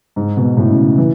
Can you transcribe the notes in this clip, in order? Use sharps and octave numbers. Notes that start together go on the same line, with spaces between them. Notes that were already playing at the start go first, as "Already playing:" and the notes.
G#2
B2
A2
C#3
E3